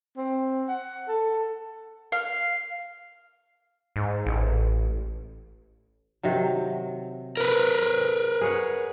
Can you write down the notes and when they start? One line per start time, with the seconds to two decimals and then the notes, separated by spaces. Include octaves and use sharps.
0.17 C4
0.69 F#5
1.08 A4
2.12 F5
3.96 G#2
4.26 A1
6.23 C3 D#3 F#3
7.37 A#4 B4
8.41 G#4 C#5 F#5